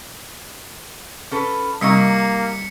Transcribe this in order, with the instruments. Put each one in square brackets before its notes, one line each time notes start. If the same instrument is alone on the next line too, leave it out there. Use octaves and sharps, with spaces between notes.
[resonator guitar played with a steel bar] C#4 A4 B4
[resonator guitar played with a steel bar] C3 D#4 [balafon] G3 C#6 [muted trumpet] A#3 [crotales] B6 C#7